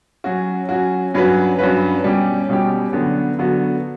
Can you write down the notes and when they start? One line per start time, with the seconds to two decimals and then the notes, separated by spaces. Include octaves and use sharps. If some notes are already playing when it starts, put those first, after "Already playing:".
0.24 F#3 C#4 F#4
0.69 F#3 C#4 F#4
1.14 G2 F#3 C#4 F#4 B4
1.59 G2 F#3 C#4 F#4 B4
2.04 B2 G3 C#4 G4
2.49 B2 G3 C#4 G4
2.93 D3 F#3 B3 F#4 A4
3.39 D3 F#3 B3 F#4 A4